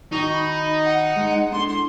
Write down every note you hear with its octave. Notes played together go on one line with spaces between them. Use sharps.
D#3 D#4 F#4 C#6
B5
F#5
G#3
D4 E4 A4 C6
C6